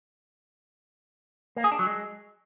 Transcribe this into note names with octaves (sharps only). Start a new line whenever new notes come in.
A#3
G#4
D4
F#3
G#3